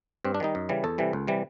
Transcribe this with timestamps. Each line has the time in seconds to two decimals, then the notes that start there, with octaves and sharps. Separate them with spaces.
0.25 G2 C4
0.35 D4
0.40 D#3 G3 D#4
0.55 F#2
0.69 C#3 E3 G3
0.84 E2 A4
0.98 C3 E3 G3
1.13 C#2
1.27 C3 E3 G3